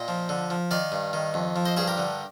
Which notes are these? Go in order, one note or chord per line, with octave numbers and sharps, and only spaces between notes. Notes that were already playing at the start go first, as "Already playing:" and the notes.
Already playing: A#2 D#5 G5
F3
D3
F3
D#3 D5 F5
G2
D#3
F2
F3
C5 D#5
G2 G#4 C5
G4 A#4
D3